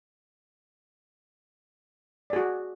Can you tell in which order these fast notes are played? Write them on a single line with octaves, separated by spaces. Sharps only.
D5 G#4 F#4